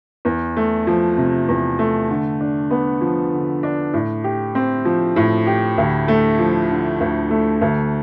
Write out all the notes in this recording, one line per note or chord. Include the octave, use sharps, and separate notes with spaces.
E2
A3
F3
C3
E2
A3
D3
D4
B3
F3
D3
D4
A2
G4
C4
F3
A2
G4
D2
A3
F3
D3
D2
A3
D2